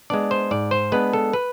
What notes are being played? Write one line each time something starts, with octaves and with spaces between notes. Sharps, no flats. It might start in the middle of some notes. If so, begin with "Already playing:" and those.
G#3 B3 D4 D5
C5
G#2 D5
C5
G#3 B3 D4 B4
A4
B4